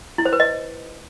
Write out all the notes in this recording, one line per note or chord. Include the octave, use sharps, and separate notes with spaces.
E4
C5
B4
D#5